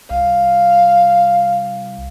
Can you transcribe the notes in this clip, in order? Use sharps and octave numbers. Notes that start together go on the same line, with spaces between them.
C2 F5